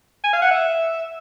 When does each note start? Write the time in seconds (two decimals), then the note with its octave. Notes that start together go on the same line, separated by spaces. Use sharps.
0.24 G#5
0.33 F5
0.42 F#5
0.51 E5